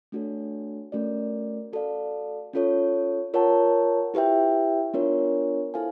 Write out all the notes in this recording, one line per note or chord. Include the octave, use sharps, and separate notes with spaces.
A3 D4 F#4 A4 C#5
A3 C#4 F#4 A#4 D5
F#4 A4 D5 F5
C#4 F4 A4 C#5
F4 A#4 C#5 F#5 A5
E4 G4 B4 E5 G5
B3 D4 F4 A#4 C#5
E4 A4 C5 F5 G#5